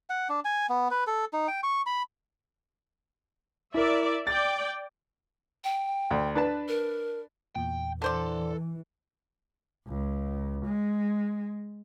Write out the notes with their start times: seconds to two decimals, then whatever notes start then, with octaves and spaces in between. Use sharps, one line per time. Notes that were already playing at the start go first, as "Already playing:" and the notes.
0.10 F#5
0.29 D4
0.45 G#5
0.70 B3
0.91 B4
1.07 A4
1.33 D#4
1.48 G5
1.63 C#6
1.86 B5
3.74 E4 A#4 D5 E5
4.27 D5 G5 A6
5.64 G5
6.11 D2
6.35 D4 B4 A5
6.68 A#4
7.56 E2 A#2 G5
8.02 D3 E3 A4 C5 D5
9.87 C#2
10.66 G#3